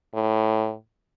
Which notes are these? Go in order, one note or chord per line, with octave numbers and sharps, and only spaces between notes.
A2